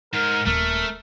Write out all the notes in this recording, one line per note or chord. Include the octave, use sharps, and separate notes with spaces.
G#2 A#4
D#1 A3 A#4